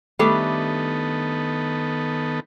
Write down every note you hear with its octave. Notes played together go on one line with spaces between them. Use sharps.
D#3 G3 A3 B3 D4 A4